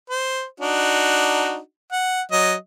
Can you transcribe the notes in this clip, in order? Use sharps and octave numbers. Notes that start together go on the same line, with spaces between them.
C5
D4 D#4 F#4
F#5
F#3 D#5